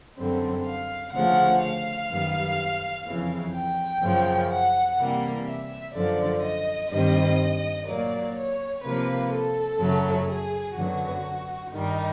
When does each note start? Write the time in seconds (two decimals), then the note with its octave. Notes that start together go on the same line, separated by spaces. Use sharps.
0.17 F#2 D3 G3 C4
0.65 F5
1.14 D2 C#3 F3 F#5
1.61 F5
2.09 F#2 D#3 G3 B3
3.06 F2 C#3 E3
3.54 G5
4.02 F#2 C#3 F3
4.50 F#5
4.98 C3 E3 G3 A#3
5.47 E5
5.94 F#2 D3 F3 D5
6.42 D#5
6.90 G2 D#3 G3 C4 D#5
7.86 A#2 F#3 A#3 D5
8.35 C#5
8.83 C3 F3 A#3 B4
9.31 A4
9.79 F#2 C#3 F#3 A3
10.27 G#4
10.76 F#2 D3 F#3 B3 F#4
11.72 G2 D#3 G3 D#4